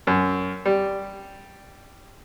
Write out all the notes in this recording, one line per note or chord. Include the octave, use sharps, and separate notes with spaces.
F#2
G3